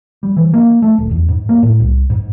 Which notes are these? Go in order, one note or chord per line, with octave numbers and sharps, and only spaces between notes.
G3
E3
A#3
A3
D1
E2
G#2
A#3
A2
C2
G#2